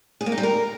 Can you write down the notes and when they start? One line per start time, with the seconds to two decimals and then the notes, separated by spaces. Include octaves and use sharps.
0.21 G#4
0.26 A#3
0.32 D#4
0.38 G3
0.43 A#4